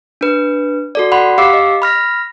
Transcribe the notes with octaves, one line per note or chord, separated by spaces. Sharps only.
D4 B4
F#4 A4 D5
F#5 B5 C6
G4 F5 D6 E6 C7
D#5
B5 F6 A#6